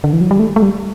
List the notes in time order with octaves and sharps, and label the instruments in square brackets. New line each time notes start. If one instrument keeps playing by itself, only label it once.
[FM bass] D3
E3
F#3
G3
A3
A3
G3